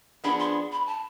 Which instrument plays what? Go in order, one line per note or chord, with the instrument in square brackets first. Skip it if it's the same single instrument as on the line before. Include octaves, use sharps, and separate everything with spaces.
[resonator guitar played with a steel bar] F3 B3 D4 G#4 [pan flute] B5
[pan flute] C6
B5
A5